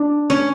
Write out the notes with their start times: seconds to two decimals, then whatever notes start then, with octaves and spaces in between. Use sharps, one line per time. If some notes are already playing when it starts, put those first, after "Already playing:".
Already playing: D4
0.30 C#4